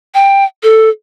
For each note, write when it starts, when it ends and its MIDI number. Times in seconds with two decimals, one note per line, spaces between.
0.14 0.45 79
0.63 0.89 69